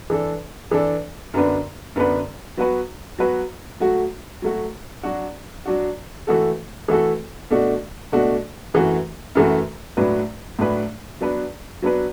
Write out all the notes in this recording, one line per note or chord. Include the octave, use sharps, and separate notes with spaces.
E3 D4 A4
E3 D4 A4
F#2 D3 B3 D4 B4
F#2 D3 B3 D4 B4
F#3 B3 F#4 B4
F#3 B3 F#4 B4
F#3 A3 F#4
F#3 A3 F#4
F#3 D4 F#4
F#3 D4 F#4
E3 A3 F#4 A4
E3 A3 F#4 A4
B2 A3 D4 F#4
B2 A3 D4 F#4
F#2 E3 A3 F#4
F#2 E3 A3 F#4
A2 F#3 D4 B4
A2 F#3 D4 B4
F#3 B3 D4 B4
F#3 B3 D4 B4